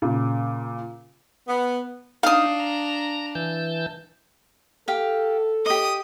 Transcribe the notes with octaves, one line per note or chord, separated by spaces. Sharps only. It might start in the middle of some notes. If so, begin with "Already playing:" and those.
A#2 C#3
B3
D4 D#4 F5 D#6
A#5
E3 A5 G6
G4 A4 F5
G4 D#5 D#6